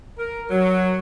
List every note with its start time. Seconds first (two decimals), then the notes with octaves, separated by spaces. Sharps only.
0.18 A#4
0.50 F#3